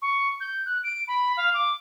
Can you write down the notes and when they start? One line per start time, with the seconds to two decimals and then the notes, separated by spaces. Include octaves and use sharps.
0.02 C#6
0.40 G6
0.66 F#6
0.84 D7
1.08 B5
1.37 F5
1.54 D6